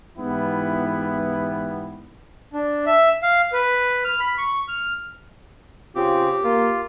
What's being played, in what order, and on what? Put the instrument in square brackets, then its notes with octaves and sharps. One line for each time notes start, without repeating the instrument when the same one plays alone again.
[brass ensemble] G#2 E3 B3 E4 G4
[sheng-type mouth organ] D4
E5
F5
B4
F6
B5
C#6
F6
[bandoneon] C#3 C4 [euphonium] F4 [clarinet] G4
[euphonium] A#3 [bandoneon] F4